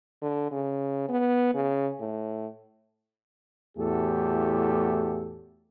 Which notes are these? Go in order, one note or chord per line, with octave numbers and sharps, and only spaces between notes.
D3
C#3
B3
C#3
A2
E2 A2 A3 F#4 G4 A4